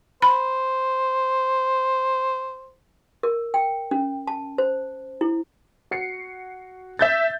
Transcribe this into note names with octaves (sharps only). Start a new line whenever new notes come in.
C5 B5
A#4
G5
C#4
A5
C5
E4
F#4 C7 C#7
E5 G6 A6